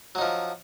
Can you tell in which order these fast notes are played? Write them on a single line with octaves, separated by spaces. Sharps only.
F#3 D#4 F3